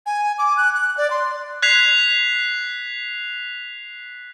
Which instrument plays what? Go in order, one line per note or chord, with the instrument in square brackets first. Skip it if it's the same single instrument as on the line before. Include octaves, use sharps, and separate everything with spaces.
[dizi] G#5
D6
F#6
F#6
D5
C6
[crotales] F#6 G#6 B6 C7 F7